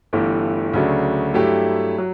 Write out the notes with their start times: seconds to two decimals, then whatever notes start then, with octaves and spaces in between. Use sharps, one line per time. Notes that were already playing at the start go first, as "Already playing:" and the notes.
0.13 G1 G2 E3 A3
0.73 D2 C#3 F#3 A3 D4
1.34 G2 F#3 A3 E4 G4
1.98 F#3